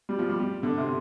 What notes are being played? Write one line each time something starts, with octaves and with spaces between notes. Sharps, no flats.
G3
F3
G3
G3
D3
C3